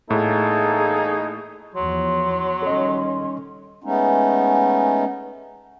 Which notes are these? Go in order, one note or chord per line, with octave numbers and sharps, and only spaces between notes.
E2 A2 A#3 D#4 G#4 A4
E2 F3 F#3 C6
D#3 G3 C#4 A4 D#5
G#3 A3 B3 C#4 D#4